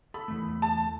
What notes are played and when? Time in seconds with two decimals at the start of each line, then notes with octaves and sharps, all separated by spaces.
0.14 A4 B5
0.28 E2 G#2 A3
0.62 A5